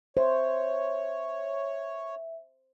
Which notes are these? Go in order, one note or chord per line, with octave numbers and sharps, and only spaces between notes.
C5 C#5 E5